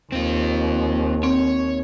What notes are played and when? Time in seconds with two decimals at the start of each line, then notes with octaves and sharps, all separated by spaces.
0.12 D#2 C4 F4
1.23 C4 C#5